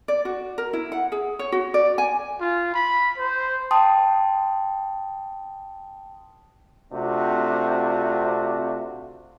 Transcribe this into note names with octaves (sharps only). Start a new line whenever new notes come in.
D5
F#4
A#4
E4
F#5
G#4
C#5
F#4
D5
G#5
F4
B5
C5
G5 A5 C6 D#6
C3 A3 C4 D4 F4 F#4